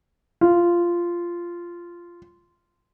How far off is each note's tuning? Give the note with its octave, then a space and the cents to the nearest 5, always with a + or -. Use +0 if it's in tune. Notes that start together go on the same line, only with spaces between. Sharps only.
F4 -10